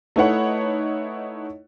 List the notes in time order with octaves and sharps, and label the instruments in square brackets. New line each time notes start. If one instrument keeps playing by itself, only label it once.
[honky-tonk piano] A3 D#4 E4 B4 C#5 F#5